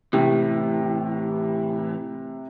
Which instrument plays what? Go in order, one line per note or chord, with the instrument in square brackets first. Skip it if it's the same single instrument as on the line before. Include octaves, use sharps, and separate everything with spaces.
[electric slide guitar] A2 E3 [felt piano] C3